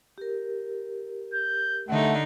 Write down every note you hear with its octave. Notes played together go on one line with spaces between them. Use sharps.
G4 A#4
G6
D3 A3 D4 D#4 F#5